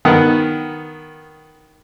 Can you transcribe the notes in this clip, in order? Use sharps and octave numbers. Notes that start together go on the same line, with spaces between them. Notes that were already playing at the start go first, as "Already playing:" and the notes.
D#3 B3 F#5